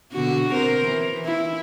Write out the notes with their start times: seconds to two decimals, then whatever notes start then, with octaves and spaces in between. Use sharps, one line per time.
0.13 B2 D3 F#4
0.53 C4 A#4 C5
0.85 E3
1.26 E4